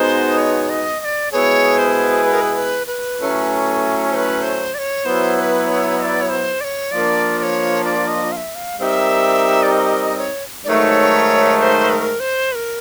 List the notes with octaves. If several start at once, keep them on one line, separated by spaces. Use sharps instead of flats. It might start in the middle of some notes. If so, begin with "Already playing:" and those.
Already playing: B2 G#3 B3 D#4 C5
C#5
D#5
D#5
D5
B2 G#3 B3 E4 G#4 C#5
C5
B4
A#4
B4
B4
B4
A2 F#3 A3 C#4
C5
B4
C5
D5
C#5
F#3 B3 E4 C5
C5
B4
C#5
D#5
D5
C#5
C5
D5
C#5
F3 A#3 D4 D5
D5
C#5
D5
D#5
F5
E5
F5
G3 C4 D#4 G4 A#4 E5 F5
D5
D#5
C#5
G#2 D#3 F#3 A3 C#5 D5
C#5
C5
B4
A#4
C5
B4
A#4